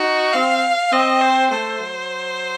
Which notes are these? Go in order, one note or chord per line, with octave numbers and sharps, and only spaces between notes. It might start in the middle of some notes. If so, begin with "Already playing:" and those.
Already playing: D#4 F#4
C4 F5
C4 D#5
C5
A3 C5
F#3